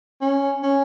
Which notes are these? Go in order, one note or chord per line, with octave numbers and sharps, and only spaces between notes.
C#4
C#4